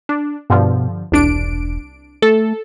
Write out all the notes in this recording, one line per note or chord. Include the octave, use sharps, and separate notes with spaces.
D4
G2 B2 D3 F3
E1 C2 D4 D7
A3 A4